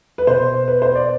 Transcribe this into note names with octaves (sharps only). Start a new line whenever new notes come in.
B4
B2 C5
B4
C5
D5